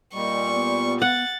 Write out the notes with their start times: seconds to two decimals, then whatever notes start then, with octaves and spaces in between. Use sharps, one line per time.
0.14 A#2 G3 D#5 C#6
0.52 B3
1.02 F#5 A6